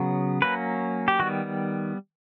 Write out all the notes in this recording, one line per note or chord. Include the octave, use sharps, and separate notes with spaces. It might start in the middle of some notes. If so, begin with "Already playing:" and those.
Already playing: C#3 F#3 B3
F#3 A#3 C#4 B4
G4
D#3 G3 B3 F#4